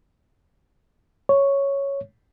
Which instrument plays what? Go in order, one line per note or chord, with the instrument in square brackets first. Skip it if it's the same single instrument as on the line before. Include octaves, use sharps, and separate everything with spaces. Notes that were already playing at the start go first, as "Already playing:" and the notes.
[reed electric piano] C#5